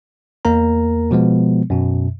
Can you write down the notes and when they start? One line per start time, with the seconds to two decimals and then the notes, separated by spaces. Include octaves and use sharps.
0.45 E2 A#3 A#4 A#5
1.11 B2 F3 G#3 B3
1.70 F#2 B2